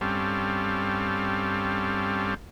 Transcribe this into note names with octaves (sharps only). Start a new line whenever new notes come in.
G2 G3 C4 C#4 A4 F5